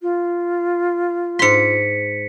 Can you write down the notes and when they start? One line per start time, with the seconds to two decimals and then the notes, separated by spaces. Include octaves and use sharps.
0.01 F4
1.39 G#2 C6 B6 C#7